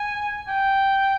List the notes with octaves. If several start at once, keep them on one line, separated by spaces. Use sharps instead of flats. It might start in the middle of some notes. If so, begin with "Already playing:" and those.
Already playing: G#5
G5